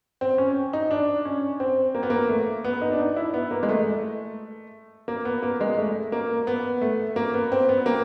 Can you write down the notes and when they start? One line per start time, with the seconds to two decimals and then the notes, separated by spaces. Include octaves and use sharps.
0.21 C4
0.38 C#4
0.73 D#4
0.91 D4
1.25 C#4
1.60 C4
1.95 A#3
2.03 B3
2.10 A#3
2.29 A3
2.64 B3
2.81 D#4
2.92 D4
2.99 D#4
3.16 E4
3.34 B3
3.51 A#3
3.63 G#3
3.69 A3
5.08 A#3
5.25 B3
5.42 A#3
5.61 G#3
5.77 A3
6.12 A#3
6.47 B3
6.81 A3
7.16 A#3
7.34 B3
7.52 C4
7.69 B3
7.86 A#3